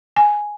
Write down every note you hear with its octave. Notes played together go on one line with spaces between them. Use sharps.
G#5